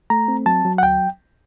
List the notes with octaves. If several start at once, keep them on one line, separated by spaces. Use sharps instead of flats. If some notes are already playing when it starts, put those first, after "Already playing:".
A3 A#5
C4
F#3 A5
F#3
F#5
D2 G5